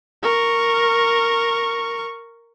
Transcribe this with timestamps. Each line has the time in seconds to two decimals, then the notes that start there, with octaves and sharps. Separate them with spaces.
0.23 A#4 C#6